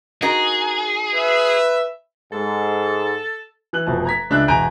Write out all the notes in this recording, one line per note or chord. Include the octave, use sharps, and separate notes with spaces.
D#4 F#4 G#4 A#4
B4 E5
G#2 A4
E3 F#6 F#7
F1 B2 F3 A5
A#5 G#6 B6
C#2 D4 E5 F#6
E1 G#5 A#5 G6 D7